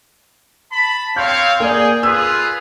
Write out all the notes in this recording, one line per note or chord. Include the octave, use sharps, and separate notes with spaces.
A5 B5
C4 C#5 F5 G6
A#3 G#4 D5 G5
F4 G#4 B4 E6